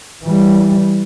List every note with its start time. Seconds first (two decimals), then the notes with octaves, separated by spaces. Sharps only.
0.24 E3 G3